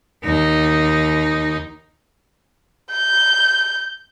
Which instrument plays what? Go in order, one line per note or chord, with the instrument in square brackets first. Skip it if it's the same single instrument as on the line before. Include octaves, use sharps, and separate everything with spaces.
[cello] D#2 D#4
[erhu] G6